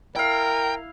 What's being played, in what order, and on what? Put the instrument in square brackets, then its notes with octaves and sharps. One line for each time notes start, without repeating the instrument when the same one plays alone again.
[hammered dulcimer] E4 F5 [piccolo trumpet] A#4 [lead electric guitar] G5